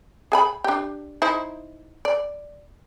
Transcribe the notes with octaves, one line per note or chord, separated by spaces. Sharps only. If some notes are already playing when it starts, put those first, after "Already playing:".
G#4 G#5 B5
D4 G4
D#4 E4 C5
D5